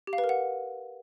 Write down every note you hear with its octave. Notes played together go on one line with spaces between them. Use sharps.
G4
F5
B4
A#4
F#5